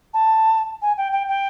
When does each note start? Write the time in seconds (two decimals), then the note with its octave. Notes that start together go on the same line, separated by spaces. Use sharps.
0.14 A5
0.82 G#5
0.98 G5
1.12 G5
1.28 G5